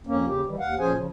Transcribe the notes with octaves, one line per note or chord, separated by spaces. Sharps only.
F2 A#3 C#4
D#2 C#3 G4
D#3 E3 G3
D#2 F5 F#5
A#2 F3 C#4 G#4 C5 G#5
C#3 F3